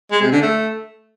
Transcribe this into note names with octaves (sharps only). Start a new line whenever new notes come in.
G#3
C3
D3
A3